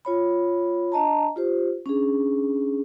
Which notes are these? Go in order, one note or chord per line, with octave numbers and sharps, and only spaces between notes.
F4 C#5 B5
D4 D#5 A5 A#5
F4 G4 C5
C#4 D4 G#4